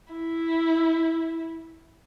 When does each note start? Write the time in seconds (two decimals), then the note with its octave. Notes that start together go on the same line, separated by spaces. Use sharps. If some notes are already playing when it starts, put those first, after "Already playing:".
0.13 E4